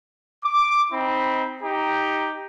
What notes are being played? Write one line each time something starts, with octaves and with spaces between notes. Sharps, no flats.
D6
C4 D#4 B5
D#4 G4 A#5